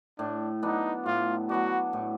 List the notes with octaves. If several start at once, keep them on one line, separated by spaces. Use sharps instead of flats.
A2 D4
F#3 B3 D4 D#4
A2 F4
F#3 B3 D4 F#4
A2